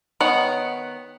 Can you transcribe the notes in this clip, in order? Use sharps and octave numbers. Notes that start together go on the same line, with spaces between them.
D#3 B3 C#5 F#5